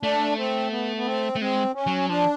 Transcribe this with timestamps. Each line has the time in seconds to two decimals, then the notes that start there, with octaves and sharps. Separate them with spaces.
0.03 A3 D4
0.37 C4
0.71 B3
0.97 B3
1.06 C4
1.36 A3
1.41 G#3 C4
1.75 C#4
1.87 F#3
2.09 F3 D4